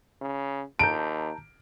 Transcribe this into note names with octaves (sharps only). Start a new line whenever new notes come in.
C#3
D#2 A5 A#5 G6 D7